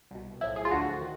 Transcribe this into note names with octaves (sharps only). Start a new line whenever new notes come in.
C2 B2
B1 A2 F3 E4
G#4
F4
D2 D3 F3 F#4
D#3